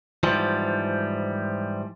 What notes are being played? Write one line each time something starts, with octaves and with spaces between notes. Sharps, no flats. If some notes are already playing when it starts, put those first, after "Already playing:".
G#2 E3 F3 G3